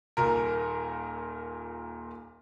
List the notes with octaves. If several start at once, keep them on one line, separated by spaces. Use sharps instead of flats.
D#1 A#2 A#4